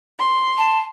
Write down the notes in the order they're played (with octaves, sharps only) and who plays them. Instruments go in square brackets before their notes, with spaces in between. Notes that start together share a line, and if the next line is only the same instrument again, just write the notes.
[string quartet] C6
[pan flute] A5